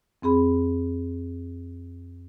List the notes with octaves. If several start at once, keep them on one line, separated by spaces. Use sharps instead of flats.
F2 C4 G#4 B5